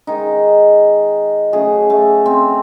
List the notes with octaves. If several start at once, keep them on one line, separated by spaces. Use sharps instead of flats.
D#3 G#3 D#4
C#3 F#3 A3 G#4
A3
C4